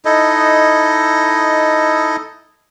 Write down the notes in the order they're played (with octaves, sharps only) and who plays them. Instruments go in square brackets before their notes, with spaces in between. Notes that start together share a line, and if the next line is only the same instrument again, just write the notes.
[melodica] D#4 E4 A4 D#5